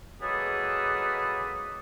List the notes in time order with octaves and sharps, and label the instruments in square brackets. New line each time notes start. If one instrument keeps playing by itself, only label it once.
[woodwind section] F#3 G#3 A#3 G#4 A4 B4